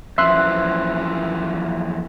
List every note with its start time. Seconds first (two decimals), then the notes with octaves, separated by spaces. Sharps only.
0.18 F#2 E3 F3 E5 C6 F#6